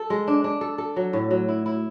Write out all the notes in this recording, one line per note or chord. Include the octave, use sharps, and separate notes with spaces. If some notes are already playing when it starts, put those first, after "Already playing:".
Already playing: A4
G#3
D4
D4
A4
A4
F#3
A2
F#3
E4
E4